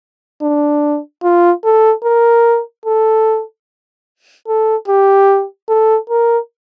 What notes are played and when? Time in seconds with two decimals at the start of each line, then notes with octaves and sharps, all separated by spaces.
0.42 D4
1.23 F4
1.64 A4
2.04 A#4
2.86 A4
4.48 A4
4.88 G4
5.69 A4
6.10 A#4